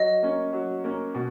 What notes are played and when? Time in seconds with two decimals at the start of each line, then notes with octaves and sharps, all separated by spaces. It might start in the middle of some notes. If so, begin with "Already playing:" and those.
Already playing: F#3 D#5
0.22 A#3 C#4
0.53 F#3
0.84 A#3 C#4
1.15 B2